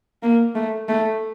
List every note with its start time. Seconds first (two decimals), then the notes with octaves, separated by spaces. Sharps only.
0.23 A#3
0.55 A3
0.89 A3